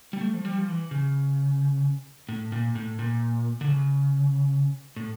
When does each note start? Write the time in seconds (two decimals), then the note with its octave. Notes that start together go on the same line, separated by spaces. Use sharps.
0.13 G3
0.21 A3
0.33 F3
0.45 G3
0.58 F3
0.68 E3
0.91 C#3
2.29 A2
2.52 A#2
2.75 A2
2.99 A#2
3.61 D3
3.67 C#3
4.96 A2